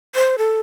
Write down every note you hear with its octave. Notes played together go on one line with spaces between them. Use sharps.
C5
A4